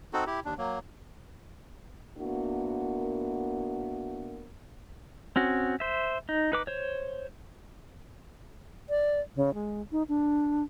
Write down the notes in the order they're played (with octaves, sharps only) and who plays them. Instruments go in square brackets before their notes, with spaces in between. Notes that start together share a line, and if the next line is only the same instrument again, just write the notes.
[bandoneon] C4 D#4 F#4 A4
E4 G4
D#2 D4
F#3 A#3
[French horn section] A#3 B3 D4 E4 F#4 A#4
[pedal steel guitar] C4 C#4 F#4
C5 E5
D#4
D#4 B4 D6
C5 C#5
[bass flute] D5
C#3
G#3
D#4
D4